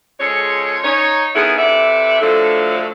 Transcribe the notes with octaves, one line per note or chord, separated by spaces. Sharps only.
C#3 F3 G#3 A4 C#5
D#4 C#5
D3 D#3 B3 C#4 E4 G#4
C3 E3 A4 D5 E5
A2 D3 F3 F#3 A3 A4